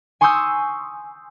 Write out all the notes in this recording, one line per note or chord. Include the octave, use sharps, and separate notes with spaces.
G#5 C6 C#6 D#6 E6 G6